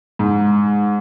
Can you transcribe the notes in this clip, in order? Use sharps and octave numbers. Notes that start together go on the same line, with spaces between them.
G#2